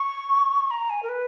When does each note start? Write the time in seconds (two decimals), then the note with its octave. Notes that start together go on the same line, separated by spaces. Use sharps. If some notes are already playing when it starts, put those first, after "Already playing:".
Already playing: C#6
0.71 A#5
0.90 G#5
1.03 A#4
1.09 B4